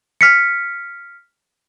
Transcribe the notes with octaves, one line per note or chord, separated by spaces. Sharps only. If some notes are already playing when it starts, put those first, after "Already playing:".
F6 B6 C#7